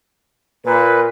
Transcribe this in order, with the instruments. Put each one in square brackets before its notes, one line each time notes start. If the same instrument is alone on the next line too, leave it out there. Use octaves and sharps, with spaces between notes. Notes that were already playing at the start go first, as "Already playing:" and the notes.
[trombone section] A#2 [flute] B4